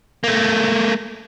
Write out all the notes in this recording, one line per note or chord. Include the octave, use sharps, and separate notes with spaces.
A3 A#3